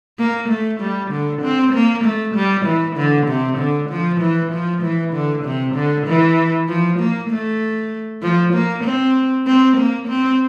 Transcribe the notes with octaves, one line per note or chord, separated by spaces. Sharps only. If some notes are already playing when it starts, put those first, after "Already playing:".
A#3
A3
G3
D3
C4
A#3
A3
G3
E3
D3
C3
D3
F3
E3
F3
E3
D3
C3
D3
E3
F3
A#3
A3
F3
A#3
C4
C4
A#3
C4